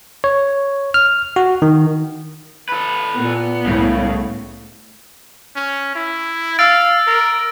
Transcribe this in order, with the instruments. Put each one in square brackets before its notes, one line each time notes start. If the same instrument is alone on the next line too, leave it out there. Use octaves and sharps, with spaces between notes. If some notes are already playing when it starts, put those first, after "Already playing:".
[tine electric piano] C#5
F6
F#4
D#3
[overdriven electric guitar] A4 B4
[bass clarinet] A#2 [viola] B3
[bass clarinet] C2 [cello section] A2 [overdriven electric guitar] C#3
[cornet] C#4
E4
[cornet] F5 [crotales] E6 A6 D7
[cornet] A#4